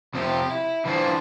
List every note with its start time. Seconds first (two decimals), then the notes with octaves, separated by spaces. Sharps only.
0.14 F2 C3 F3 A3 G4
0.50 E4
0.85 E3 G3 A#3 D4 F4 C5